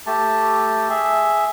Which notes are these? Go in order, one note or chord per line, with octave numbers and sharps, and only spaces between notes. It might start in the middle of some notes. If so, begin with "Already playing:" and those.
A3 G4 A5
G#4 E5